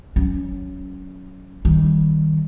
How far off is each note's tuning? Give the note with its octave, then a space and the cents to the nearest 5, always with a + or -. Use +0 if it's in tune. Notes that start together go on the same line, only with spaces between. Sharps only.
F#3 +0 C#4 +5
D#3 +5 G3 -15